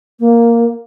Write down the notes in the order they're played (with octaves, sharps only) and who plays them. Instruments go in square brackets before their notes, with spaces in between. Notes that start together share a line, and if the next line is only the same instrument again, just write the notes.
[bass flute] A#3